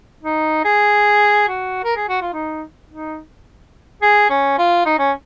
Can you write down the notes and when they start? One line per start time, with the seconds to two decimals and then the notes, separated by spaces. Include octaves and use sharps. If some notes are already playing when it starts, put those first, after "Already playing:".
0.23 D#4
0.64 G#4
1.49 F#4
1.84 A#4
1.96 G#4
2.09 F#4
2.21 F4
2.33 D#4
2.90 D#4
4.02 G#4
4.30 C#4
4.58 F4
4.86 D#4
4.99 C#4